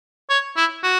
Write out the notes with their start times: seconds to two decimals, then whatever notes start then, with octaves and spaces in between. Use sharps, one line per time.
0.30 C#5
0.57 E4
0.84 F#4